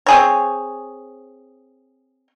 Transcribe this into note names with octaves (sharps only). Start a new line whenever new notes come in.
C4 G#4 C#5